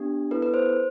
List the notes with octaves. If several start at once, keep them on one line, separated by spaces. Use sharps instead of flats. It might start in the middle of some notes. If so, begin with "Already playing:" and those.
Already playing: B3 D4 G4
B3 E4 A4 B4
B4
C5